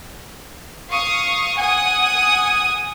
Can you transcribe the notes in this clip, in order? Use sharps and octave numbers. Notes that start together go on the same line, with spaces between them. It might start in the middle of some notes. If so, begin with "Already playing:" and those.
F5 C#6 D#6
F#5 G#5 D#6